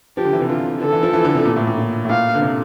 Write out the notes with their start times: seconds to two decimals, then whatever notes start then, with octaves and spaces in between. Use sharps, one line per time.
0.17 F3 G4
0.25 D3
0.33 E3
0.41 C3
0.49 D3 F4
0.82 D3 A4
0.92 E3
1.03 F3
1.13 E3
1.24 D3
1.35 C3
1.45 A#2
1.56 A2
1.67 A#2
1.77 A#2
2.05 A2
2.09 A#2 F5
2.35 D3
2.42 C3